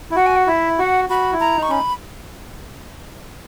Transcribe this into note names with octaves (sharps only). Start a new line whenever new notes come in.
E4
F#4 F#5
G#5
F#5
E4 E5
F#4 F#5
F#4 B5
E4
A#5
D#4
C#6
C#4 B5